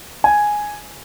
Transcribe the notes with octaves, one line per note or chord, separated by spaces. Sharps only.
G#5